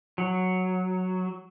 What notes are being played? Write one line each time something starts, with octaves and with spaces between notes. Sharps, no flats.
F#3